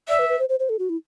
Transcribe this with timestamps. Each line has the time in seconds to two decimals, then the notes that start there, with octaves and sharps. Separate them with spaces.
0.08 D5 E5
0.19 B4
0.29 B4
0.39 C5
0.49 C5
0.60 C5
0.69 A4
0.79 F#4
0.89 E4